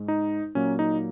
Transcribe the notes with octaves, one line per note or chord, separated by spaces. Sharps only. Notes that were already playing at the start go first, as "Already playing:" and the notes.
Already playing: G#2 G#3
D#4
A#2 F#3 A#3 C#4
D#4